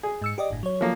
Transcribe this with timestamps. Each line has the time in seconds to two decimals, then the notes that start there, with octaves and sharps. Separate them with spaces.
0.03 G#4
0.22 G#2 E6 C#7
0.38 G4 D5 D#5
0.50 G1 A2
0.63 F#3 C#5
0.81 F3 A#3